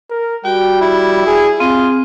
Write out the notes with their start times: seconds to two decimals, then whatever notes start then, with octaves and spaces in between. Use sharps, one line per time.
0.10 A#4
0.45 G3 F#4 G5
0.81 E4
1.27 G#4
1.60 C4 F4 G#4